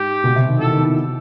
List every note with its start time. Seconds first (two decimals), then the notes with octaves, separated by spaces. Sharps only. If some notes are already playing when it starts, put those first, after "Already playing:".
Already playing: G#2 G4
0.24 B2
0.35 C3
0.48 D#3
0.59 E3 A4
0.71 D#3
0.82 E3